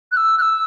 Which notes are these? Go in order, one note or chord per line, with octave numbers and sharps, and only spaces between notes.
F#6
E6
F#6
E6